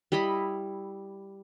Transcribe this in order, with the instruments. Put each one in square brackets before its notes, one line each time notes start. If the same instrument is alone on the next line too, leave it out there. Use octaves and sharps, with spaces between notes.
[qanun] G3 E4 D#5 B5